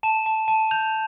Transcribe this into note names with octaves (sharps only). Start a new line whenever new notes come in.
A5 E7
A5
A5
G6 F7